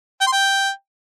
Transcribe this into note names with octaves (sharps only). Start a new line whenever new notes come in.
G5
C6
G5